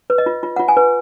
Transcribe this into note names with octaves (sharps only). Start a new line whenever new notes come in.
B4
D#5
F4
F4
F4 F#5
G#5
B4